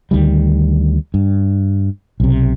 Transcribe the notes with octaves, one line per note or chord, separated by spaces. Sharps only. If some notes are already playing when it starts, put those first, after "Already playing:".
D2 D#3 G3
G2
B1 C3